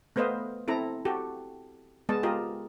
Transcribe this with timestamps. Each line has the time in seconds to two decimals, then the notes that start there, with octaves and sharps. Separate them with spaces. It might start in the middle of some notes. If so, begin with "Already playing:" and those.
0.16 A3 B3 B4 C5 D#5 F5
0.68 C4 E4 A4 A#5
1.05 F#4 G4 A4
2.09 G#3 B3 D#5 A5
2.23 F4 G4 A#4 D#5